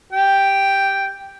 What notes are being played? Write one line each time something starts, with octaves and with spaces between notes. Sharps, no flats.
G4 G5